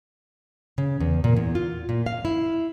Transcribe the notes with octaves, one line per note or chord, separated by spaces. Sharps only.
C#3
E2
A#2
E2
F4
A#2
F5
E4